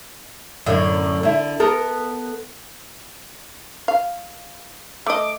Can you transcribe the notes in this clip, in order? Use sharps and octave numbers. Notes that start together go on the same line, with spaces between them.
F#2 A2 D3
D3 E4
B3 A4 A#4
F5
A3 D#5 D6